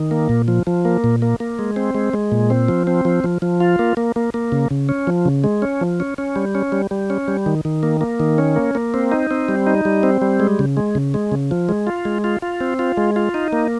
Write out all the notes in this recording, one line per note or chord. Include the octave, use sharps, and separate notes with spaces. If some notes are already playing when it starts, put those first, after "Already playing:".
Already playing: D#3
A#3
A#2
F3
F3
A#3
A#2
A#3
A#3
G#3
C4
G#3
G#3
A#2
C4
F3
C4
F3
F3
F3
F4
A#3
A#3
A#3
A#3
C#3
C#3
C#4
F3
C#3
G#3
C#4
F3
C#4
C#4
G3
C#4
G3
G3
C#4
G3
D#3
D#3
A#3
A#3
D#3
C#4
A#3
A#3
C4
D#4
C4
G3
D#4
G3
C4
G3
G#3
C#3
G#3
C#3
G#3
C#3
F3
G#3
F4
G#3
F4
F4
C4
F4
G#3
F4
D#4
A#3